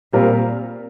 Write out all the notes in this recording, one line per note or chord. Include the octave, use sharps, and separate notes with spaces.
A#2 G3 C4 F4 A#4